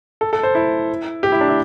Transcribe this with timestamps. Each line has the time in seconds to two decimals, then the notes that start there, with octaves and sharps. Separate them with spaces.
0.21 A4
0.33 A4
0.43 C5
0.55 E4
1.23 G4
1.32 E4
1.41 D4
1.49 E4